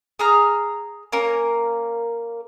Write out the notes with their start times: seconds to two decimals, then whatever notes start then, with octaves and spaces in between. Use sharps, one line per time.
0.19 G#4 A#5 F6
1.12 A#3 C#4 A#4 A#5